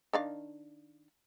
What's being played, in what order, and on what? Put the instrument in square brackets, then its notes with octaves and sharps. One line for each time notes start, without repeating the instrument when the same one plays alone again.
[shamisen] D#3 D4 F5